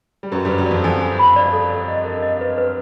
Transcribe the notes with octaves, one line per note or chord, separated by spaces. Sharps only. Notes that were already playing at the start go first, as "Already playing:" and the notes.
G3
F#2 F#3 B4
G2 G3
B4
F#2 F#3
F2 F3 D5
F2 F3 G#5
G#5
B5
D5
A4
D5
D#5
A#4
D#5
B4
B4